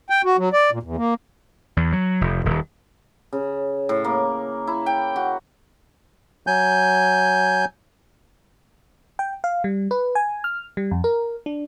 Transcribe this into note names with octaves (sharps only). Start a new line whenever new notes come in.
G5
F#4
F#3
D5
A#2
E2
A#3
E2
F#3
F1
D#1
C#3
A2
A#3
E4
G5
F#4
F#3 G#5 G6
G5
F5
G3
B4
G#5
F6
G3
F2
A#4
D4